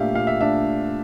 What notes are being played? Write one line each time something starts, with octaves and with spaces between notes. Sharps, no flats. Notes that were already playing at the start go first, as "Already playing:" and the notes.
Already playing: A#2 A3 D4 G4 E5 F5
A#2 F5
E5
A3 D4 E5